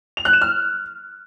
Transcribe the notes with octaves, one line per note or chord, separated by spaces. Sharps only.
F7
F#6
E7
F6